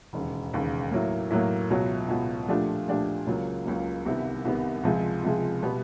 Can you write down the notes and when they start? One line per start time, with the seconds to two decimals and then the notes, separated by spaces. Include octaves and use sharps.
0.13 E1 D#2 C#3
0.53 E1 D#2 C#3
0.91 A2 F#3 A#3
1.31 A2 F#3 A#3
1.70 C#2 B2 F#3
2.08 C#2 B2 F#3
2.48 A#2 F3 A3 D4 G4
2.88 A#2 F3 A3 D4 G4
3.27 C#2 C#3 F#3 A#3
3.65 C#2 C#3 F#3 A#3
4.05 C2 C3 D#3 G3 B3
4.45 C2 C3 D#3 G3 B3
4.83 C#2 C3 F3 G#3
5.23 C#2 C3 F3 G#3
5.63 B2 G3 B3